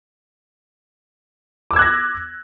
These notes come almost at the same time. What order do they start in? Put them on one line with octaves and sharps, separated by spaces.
D6 E6 G#6 F#6 A#6